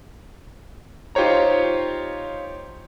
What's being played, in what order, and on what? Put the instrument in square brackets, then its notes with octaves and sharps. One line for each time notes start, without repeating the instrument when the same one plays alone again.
[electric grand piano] D#4 F4 G4 C5 C#5 A#5